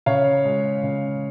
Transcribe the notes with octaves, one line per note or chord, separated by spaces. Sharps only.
C#3 C#5 F5
G#3
C#3